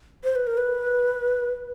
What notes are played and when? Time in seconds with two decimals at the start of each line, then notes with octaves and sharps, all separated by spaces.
0.24 C5
0.35 B4
0.47 A#4
0.57 B4